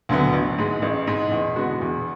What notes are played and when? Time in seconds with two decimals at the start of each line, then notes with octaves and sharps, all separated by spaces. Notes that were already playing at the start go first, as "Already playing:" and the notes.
0.09 D2 D3 F#3 B3
0.33 A1
0.58 G#2 G#3
0.82 A1
1.07 G#2 G#3
1.31 E2
1.56 D3 G#3 B3 F#4
1.81 E2